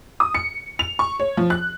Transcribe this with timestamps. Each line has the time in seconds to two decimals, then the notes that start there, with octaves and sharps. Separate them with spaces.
0.20 D#6
0.35 C#7
0.79 F7
0.99 C#6
1.20 C#5
1.37 F3
1.50 F#6